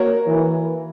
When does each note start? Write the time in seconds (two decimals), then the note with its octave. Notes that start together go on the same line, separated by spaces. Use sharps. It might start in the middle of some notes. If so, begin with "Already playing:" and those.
Already playing: A#3 F#4 A#4 C#5
0.27 E3